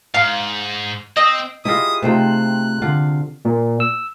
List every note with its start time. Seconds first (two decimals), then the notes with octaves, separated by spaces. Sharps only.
0.14 G#2 F5
1.17 C4 D#5
1.65 E4 F4 G4 G#4 D#5 D#6
2.03 C3 A3 D#4 F4 C5 G5 F#6
2.82 D3 F4 F#5
3.45 A#2
3.80 E6